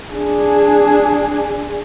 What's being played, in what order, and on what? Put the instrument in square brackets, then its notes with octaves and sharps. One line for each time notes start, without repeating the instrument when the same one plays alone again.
[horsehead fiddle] D4 G#4